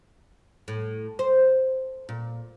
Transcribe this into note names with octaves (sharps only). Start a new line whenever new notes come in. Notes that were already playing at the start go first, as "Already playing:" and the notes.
A2
C5
A#2